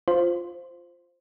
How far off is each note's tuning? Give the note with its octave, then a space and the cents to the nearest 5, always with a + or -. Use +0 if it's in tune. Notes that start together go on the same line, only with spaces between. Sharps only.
F4 +0 C5 +0